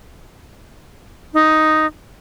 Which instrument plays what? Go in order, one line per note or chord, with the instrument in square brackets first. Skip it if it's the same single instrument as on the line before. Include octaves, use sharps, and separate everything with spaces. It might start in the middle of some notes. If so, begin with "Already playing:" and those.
[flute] D#4